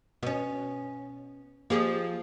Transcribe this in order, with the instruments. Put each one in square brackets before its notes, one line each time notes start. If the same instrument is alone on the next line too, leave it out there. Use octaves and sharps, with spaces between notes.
[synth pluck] B2 [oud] B3 C#4
[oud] F3 [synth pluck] A#3 G4 G#4